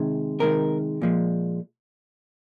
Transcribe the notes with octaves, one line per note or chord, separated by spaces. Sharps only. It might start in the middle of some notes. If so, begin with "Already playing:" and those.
Already playing: C3 D#3 G#3
C3 D#3 G#3 A#4
A#2 F3 G#3